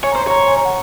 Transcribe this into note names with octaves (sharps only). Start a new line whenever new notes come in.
C#5 G#5
A#5
C5
C6
C#5 A#5
C6
G#5
A#5
F#5